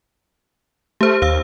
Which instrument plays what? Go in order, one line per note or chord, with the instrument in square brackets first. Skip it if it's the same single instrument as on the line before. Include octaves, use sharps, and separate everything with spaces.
[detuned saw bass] A3 [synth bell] G4 C5
[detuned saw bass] D#2 [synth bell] C5 F5 E6